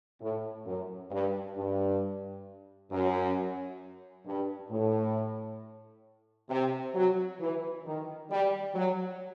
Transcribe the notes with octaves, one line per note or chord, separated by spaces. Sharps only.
A2
F#2
G2
G2
F#2
G2
A2
C3
F#3
E3
D#3
G3
F#3